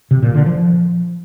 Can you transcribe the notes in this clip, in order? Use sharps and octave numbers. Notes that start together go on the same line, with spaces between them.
C3
A#2
D3
F3